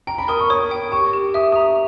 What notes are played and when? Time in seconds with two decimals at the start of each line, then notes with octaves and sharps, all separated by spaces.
0.07 G5 A#5
0.18 B5
0.28 A#4 D#6
0.40 C#6
0.50 C#5 D#6
0.71 G5
0.92 G4 C#6
1.13 G4
1.34 E5 D#6
1.52 A#5 D#6